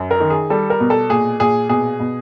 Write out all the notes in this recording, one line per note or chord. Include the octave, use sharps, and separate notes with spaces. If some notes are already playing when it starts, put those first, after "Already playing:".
Already playing: F#2
A#4
D#3
G#4
G3 A4
A#4
B2
A4
A#2 G#4
A#2 G#4
B2 G#4
B2